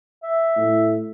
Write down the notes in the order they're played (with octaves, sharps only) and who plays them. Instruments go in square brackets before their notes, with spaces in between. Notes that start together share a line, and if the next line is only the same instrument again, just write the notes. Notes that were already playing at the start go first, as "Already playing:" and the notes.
[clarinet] E5
[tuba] A2